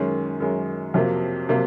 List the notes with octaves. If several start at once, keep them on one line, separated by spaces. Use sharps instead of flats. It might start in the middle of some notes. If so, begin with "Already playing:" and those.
Already playing: F#2 D#3 G#3 C#4
F#2 D#3 G#3 C#4
F2 C3 F#3 A#3
C3 F#3 A#3